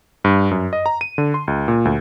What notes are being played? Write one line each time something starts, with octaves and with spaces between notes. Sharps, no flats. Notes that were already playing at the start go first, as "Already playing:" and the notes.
G2
F#2
D#5
A#5
D#7
D3
C6
C#2
A#2
D2